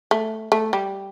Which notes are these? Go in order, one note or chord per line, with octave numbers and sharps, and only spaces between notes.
A3
A3
G3